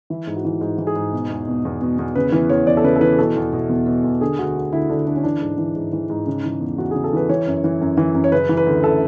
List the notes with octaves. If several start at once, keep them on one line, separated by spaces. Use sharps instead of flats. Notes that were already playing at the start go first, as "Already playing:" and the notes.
E3 E4
G#2
F#4
E3
G#2
E3
G#4
G#2
B2
E2
B2
E2
B2
E2
C#3 B4
E3 B4
E2 C#5
E2 D5
A4
C#3 B4
A4
E3 B4
B2 A4
E2
B2
E2
B2
E2
D3 G#4
D2 F#4
D3
D2 E4
D3 D4
D2 D4
C#4
E3 D4
G#2
E3
G#2
E3
G#2
C#3
E3
E2
E2 F#4
C#3 G#4
A4
E3 B4
E3 C#5
F#2
E3
F#2
E3
F#2
C#5
C#3 B4
E3
B4
D2
A4